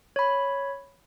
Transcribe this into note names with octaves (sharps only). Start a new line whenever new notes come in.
C#5 B5